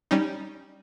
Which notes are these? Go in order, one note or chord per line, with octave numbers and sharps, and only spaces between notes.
G3 C#4 D#4